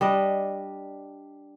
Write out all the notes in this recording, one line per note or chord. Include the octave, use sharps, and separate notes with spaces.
G3 D4 D#5